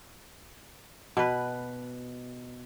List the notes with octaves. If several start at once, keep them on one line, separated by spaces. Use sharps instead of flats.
B2 B4